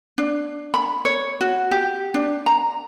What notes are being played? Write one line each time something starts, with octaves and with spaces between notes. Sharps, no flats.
D4
B5
C#5
F#4
G4
D4
A#5